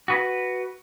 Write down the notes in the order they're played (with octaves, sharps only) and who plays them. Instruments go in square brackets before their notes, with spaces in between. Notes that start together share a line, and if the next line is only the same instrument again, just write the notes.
[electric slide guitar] F#4 B4